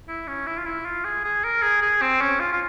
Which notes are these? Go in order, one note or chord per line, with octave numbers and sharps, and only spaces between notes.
E4
C#4
E4
F4
E4
F4
G#4
G#4
A#4
G#4
G#4
C4
C#4
F4
F4